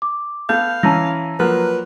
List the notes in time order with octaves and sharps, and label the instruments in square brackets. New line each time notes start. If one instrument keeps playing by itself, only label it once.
[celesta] D6
[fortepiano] A3 B3 A4 [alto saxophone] F5 [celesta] G6
[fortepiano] E3 C#4 [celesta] A5 A#5 A#6
[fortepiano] F3 F#3 A#3 [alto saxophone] B4